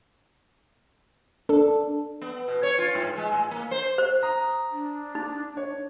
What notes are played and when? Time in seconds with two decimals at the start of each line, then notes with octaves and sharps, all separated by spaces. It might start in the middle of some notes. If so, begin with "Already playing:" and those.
1.49 D4 A4
2.21 B3
2.48 B2
2.63 C#5
2.78 F4
2.95 G#2
3.17 G#3
3.32 A2
3.51 A#3
3.71 C5
3.98 C5
4.23 A#5 D#6
4.72 D4
5.15 D#4
5.57 C#5